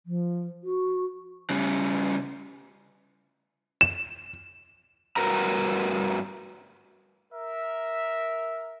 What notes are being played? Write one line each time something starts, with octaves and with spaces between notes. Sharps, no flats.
F3
F#4
C#3 G3
E7
G2 F#4 A#4 B4 A#5
A#4 E5